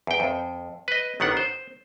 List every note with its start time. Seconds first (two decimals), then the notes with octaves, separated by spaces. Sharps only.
0.07 E2 G5
0.20 F2
0.88 B4 D#5
1.20 A1 D#3 B3 D4 F#5
1.37 C5